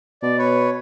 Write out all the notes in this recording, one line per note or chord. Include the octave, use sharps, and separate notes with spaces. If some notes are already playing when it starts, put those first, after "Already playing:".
B2 D5
B4 C#5